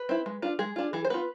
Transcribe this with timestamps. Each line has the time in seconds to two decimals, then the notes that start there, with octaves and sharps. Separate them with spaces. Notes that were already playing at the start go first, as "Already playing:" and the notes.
Already playing: B4
0.09 C4 E4
0.26 G#3
0.42 D4 F4
0.59 G#3 G#4
0.76 D4 F4
0.93 E3 G#4
1.05 C5
1.10 B3 F4 B4